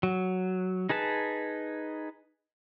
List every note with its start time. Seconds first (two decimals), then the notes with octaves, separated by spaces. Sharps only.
0.03 F#3
0.89 D#4 G#4 B4 A5